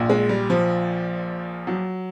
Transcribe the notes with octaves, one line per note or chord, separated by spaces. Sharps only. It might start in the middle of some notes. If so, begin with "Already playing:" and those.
Already playing: A#1 A#2
G#3
G3
F3
F#3